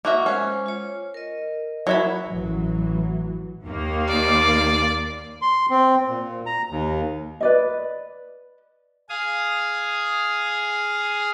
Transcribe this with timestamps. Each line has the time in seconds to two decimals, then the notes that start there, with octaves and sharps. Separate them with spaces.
0.05 A#3 F#4 E5
0.26 G#3 C#4 C5
0.66 F4 C#5
1.14 A#4 D#5
1.87 F#3 E4 B5
2.27 A1 E3 F#3
3.64 D#2 A#3
4.08 D5
5.42 C6
5.70 C4
6.08 A#2
6.46 A#5
6.71 D#2
7.41 B4 D5 D#5
9.09 G#4 F5 G#5 D#6